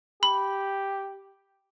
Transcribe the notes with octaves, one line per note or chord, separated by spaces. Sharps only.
G4 B5